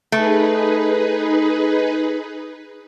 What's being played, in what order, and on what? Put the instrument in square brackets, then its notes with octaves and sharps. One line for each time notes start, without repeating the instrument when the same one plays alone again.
[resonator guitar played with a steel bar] A3 [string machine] D#4 G#4 B4